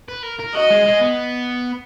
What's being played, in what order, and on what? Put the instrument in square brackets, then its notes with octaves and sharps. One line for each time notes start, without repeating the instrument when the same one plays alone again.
[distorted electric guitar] B4
A#4
A#4
[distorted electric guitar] F#4 [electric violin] D#5
[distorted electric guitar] G#3
G#3
B3